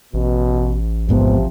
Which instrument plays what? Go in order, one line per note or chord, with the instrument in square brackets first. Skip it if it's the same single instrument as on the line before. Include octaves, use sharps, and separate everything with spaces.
[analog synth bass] A1 [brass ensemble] B2
[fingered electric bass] F1 G#2 B3 [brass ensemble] C3 F3